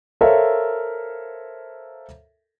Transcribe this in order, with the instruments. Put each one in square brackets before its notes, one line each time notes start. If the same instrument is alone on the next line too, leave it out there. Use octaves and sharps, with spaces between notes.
[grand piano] A4 A#4 C5 C#5 E5 F5